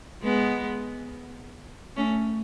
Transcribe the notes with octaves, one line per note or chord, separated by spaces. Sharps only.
G#3 B3
A3 C#4